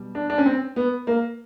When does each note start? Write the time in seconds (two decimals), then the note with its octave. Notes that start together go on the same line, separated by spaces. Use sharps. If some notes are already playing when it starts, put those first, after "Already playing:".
Already playing: B2 G3
0.15 D4
0.30 D4
0.38 C#4
0.46 C4
0.76 B3
1.07 A#3